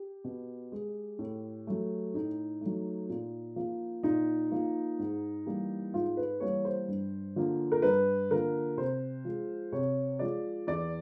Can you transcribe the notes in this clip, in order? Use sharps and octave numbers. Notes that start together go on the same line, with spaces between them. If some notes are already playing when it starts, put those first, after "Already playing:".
Already playing: G4
B2
G#3
A2
F#3 A3
A2 D#4
F#3 A3
A#2
F3 A#3
A#2 D#4
F3 A#3
G#2
E3 G3 A#3
G#2 F4
B4
E3 G3 A#3 C#5
C5
G2
D3 F3 A#3
A#4
G2 B4
D3 F3 A#3 A#4
C3 C5
F3 G#3
C3 C#5
F3 G#3 D5
E2 D5